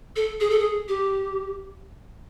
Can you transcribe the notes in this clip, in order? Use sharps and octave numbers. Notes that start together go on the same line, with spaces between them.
A4
G#4
A4
G#4
G4